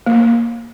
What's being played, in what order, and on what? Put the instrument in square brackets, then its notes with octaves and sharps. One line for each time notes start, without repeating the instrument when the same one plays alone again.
[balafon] A#3